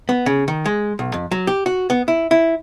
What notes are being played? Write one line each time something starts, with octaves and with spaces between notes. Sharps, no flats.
B3
C#3
D#3
G#3
B1
F2
F#3
G4
F#4
B3
E4
E4